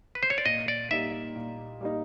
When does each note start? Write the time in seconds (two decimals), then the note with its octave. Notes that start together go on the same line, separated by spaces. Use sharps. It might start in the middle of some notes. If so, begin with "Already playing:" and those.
0.15 B4
0.23 C5
0.30 C#5
0.38 D5
0.45 A#2 D#5
0.68 D5
0.91 G3 A#3 D#4 E5
1.36 A#2
1.81 G3 A#3 D#4